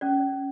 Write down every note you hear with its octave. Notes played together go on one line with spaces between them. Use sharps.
C#4 D5